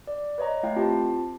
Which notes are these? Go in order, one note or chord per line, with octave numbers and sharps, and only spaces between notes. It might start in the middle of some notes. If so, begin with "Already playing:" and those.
D5
B4 C#5 D#5 A#5
A3 E4 F5 G5
C4 F4 G4 A5